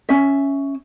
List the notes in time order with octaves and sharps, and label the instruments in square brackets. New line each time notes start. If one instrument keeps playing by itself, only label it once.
[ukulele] C#4 E5